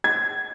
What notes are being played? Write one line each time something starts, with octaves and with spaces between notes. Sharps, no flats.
G#6